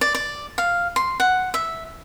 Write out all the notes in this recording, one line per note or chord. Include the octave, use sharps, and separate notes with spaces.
D5
D5
F5
C6
F#5
E5